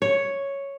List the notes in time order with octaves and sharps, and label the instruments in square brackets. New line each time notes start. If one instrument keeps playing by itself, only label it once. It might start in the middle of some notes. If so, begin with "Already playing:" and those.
[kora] C#5